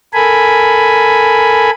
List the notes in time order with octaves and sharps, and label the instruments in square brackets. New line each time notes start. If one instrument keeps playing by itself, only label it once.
[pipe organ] A4 A#4 G#5 B5